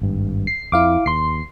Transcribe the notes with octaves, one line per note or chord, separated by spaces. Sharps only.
G#1 G2
C7
F2 E4 F5 D6
D#2 C6 C7